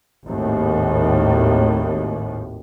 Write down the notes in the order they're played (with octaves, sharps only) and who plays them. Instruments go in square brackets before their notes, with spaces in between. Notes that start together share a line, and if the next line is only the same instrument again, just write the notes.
[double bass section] G#1 D#2 A2